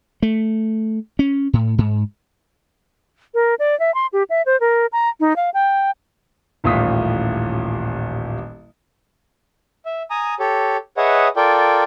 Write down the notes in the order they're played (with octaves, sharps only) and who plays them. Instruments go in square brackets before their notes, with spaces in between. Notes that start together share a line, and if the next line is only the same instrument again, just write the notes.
[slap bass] A3
C#4
A2
G#2
[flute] A#4
D5
E5
C6
G4
E5
C5
A#4
A#5
D#4
F5
G5
[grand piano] D#1 A1 A2 F4 D#6 B6
[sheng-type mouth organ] E5
G#5 A#5 D#6
G4 A4 C#5
G#4 B4 C#5 D#5 E5 F#5
F4 A4 A#4 D5 G5